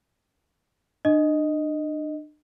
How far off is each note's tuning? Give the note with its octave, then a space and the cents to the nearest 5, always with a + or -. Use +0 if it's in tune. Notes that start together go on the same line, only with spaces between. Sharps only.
D4 +40 D#5 +0